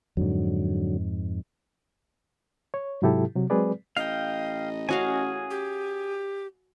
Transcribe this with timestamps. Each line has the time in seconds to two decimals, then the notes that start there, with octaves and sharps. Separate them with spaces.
0.17 F2 G#2 D3 F#3
2.74 C#5
3.02 G#2 C3 F#3 E4 G4 A4
3.35 C3 F#3
3.50 F#3 G#3 C4 G#4 B4 D5
3.97 A1 D#5 F5 G5
4.89 C#4 F#4 G#4 F5 G#5
5.51 G4